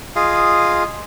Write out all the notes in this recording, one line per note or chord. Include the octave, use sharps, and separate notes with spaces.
F4 G#4 D#5 F5